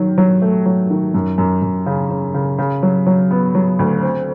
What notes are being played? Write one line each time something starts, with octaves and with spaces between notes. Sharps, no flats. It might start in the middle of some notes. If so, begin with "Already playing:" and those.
Already playing: D#3 F#3
F#3
A3
F#3
D#3
F#2
F#2
F#2
C#3
C#3
C#3
C#3
F#3
F#3
B3
F#3
D2
C4